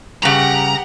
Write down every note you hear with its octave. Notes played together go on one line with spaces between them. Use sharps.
G2 C#3 G4 F#5 A#5